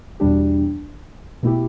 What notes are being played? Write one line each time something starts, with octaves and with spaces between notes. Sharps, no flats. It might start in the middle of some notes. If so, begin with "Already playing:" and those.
E2 B2 G3 D4 G4
B2 A3 E4 G4